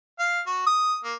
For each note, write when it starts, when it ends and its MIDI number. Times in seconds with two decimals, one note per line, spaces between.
0.19 0.40 77
0.46 0.64 66
0.66 0.96 87
1.04 1.14 58